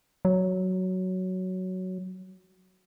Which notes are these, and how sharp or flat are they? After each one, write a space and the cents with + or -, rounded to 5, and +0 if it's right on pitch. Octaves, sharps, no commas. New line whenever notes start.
F#3 +5